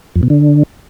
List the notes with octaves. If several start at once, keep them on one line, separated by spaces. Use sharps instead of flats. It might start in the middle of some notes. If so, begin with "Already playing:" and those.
F2
B2
D3